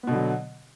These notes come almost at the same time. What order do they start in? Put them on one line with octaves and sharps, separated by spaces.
B3 B2 D3 F#3